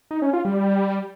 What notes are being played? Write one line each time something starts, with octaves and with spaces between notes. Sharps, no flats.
D#4
C#4
F4
G3